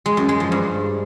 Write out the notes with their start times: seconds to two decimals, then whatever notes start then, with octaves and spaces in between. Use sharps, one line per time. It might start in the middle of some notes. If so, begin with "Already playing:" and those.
0.06 G#3
0.17 F#2
0.29 G#3
0.40 F3
0.52 G2